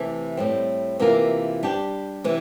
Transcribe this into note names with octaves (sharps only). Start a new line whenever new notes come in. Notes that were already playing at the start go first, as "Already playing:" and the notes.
Already playing: C3 E3 A3
A2 G3 C4
C3 E3 A#3 F4 A#4
G3 D4 G4
C3 E3